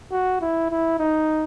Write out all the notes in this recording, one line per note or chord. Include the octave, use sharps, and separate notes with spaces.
F#4
E4
E4
D#4